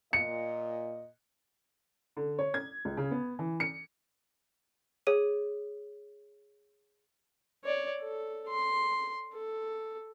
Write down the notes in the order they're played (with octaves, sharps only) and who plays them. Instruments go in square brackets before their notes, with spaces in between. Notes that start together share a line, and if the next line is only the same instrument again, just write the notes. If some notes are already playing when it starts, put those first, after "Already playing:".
[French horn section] A#2 D#5 [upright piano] C#7
[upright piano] D3
C#5
G#6
C#2
C#3
B3
E3
C#7
[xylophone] G#4 C#5 D6 D#7
[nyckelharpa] C#5 D5
A4
C6
A4